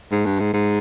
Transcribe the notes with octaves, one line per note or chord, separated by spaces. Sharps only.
G#2
G2
G#2
G#2